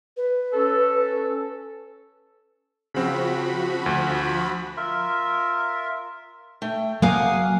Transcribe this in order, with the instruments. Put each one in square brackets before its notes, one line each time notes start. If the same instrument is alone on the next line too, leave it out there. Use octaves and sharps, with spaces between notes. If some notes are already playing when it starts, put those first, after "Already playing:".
[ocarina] B4
[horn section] C#4 A4
[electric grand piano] C#3 C4 [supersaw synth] F3 F#4 B5
[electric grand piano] D2
[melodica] F4 A#4 E5
[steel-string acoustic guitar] A3 [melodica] G5
[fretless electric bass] F#3 A#3 [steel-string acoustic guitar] A#4 F5 G#5 [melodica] F#5 D#6